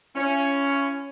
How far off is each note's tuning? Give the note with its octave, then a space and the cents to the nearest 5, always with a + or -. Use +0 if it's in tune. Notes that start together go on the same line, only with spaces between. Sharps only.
C#4 +5 E4 +45